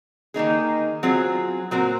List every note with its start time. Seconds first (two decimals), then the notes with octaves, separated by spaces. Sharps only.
0.34 D#3 A#3 D#4 G#4
1.03 F#3 C4 F4 G#4
1.71 A#2 F#3 C4 F#4 A#4